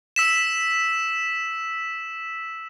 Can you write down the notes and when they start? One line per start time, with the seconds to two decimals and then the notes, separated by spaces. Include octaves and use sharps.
0.16 E6 B6 E7